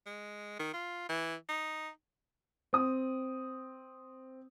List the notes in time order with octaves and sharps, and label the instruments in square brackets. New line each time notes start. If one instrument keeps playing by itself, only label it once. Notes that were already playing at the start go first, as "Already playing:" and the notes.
[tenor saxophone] G#3
D#3
F4
E3
D#4
[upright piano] C4 D#6